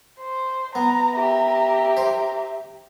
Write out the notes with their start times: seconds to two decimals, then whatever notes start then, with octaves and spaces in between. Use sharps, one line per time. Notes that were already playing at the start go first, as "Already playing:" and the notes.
0.20 C5
0.75 B3 A#5
1.14 G4 E5 A#5
1.97 C5